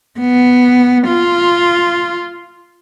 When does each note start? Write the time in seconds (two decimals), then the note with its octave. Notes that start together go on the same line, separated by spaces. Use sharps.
0.20 B3
1.08 F4